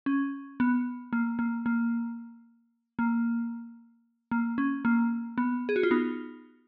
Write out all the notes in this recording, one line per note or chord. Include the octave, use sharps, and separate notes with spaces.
C#4
B3
A#3
A#3
A#3
A#3
A#3
C#4
A#3
B3
G#4
F#4
F4
B3 D#4